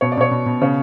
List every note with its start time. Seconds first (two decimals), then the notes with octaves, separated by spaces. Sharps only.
0.01 B2 C#5
0.12 D5
0.17 B2 C#5
0.31 B2
0.46 B2
0.61 C#3 C#5